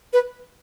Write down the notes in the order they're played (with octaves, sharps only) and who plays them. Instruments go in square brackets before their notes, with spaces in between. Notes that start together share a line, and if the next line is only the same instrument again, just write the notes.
[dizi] B4